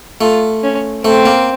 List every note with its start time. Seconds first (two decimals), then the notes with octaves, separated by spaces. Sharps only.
0.21 A3 F4
0.63 C#4
1.04 A3 C4
1.25 A#3